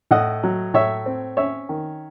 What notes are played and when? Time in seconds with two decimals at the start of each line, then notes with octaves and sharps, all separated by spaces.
0.11 A2 D#5 F#5
0.43 F#3
0.74 A2 C#5 E5
1.06 C4
1.37 C#4 C#5 E5
1.69 D#3